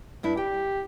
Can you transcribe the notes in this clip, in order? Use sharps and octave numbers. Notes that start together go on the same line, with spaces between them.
G2 D4 E4
G4 G5